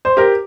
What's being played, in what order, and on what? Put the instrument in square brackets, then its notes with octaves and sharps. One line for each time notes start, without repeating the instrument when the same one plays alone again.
[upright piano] C5
G4 A#4